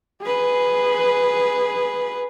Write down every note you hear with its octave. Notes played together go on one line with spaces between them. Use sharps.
G#4 B4